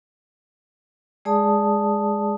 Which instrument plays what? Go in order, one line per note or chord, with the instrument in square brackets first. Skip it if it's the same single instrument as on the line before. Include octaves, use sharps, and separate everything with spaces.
[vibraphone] G#3 G#4 D5 A5 D#6